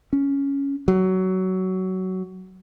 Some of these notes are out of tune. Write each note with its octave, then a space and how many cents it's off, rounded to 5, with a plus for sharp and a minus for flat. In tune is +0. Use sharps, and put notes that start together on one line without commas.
C#4 +5
F#3 +15